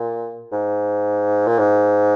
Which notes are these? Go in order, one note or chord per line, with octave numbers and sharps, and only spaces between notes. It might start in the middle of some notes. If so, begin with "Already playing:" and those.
Already playing: A#2
G#2
A#2
G#2